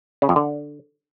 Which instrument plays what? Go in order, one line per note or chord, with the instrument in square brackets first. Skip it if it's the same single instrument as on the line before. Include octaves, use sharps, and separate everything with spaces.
[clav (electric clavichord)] C#3
F2
D3